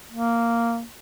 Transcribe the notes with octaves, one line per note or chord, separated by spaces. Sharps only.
A#3